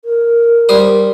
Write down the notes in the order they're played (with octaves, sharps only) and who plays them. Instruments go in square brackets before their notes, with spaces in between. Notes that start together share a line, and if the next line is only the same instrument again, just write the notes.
[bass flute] A#4
[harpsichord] G3 C5 D#6